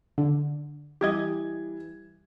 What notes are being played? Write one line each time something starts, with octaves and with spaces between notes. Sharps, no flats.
D3
E3 G3 G4 D#5 G#6